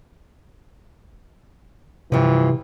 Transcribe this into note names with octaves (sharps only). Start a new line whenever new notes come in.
G2 C3 E3 F3